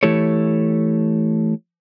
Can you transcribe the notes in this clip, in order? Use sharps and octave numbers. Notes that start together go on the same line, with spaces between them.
E3 A3 E4 G4 A4 C#5